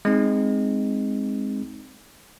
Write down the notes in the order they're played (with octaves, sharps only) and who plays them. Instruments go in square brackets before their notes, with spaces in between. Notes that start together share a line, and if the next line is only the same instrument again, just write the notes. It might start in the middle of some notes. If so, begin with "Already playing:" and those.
[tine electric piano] G#3 C4 D#4